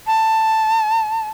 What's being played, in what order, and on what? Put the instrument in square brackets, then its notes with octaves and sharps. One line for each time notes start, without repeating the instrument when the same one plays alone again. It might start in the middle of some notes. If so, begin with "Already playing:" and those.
[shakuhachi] A5